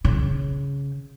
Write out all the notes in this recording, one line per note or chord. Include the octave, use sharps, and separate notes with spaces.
C#3